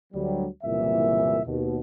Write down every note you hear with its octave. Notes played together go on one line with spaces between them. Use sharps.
D2 F#3 G3
F#1 C2 A#2 E3 E5
D#2 B2